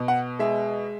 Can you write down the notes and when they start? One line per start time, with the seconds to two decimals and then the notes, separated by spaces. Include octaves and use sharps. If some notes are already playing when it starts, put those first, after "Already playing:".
Already playing: B2 B3
0.08 F#5
0.39 G#3 E5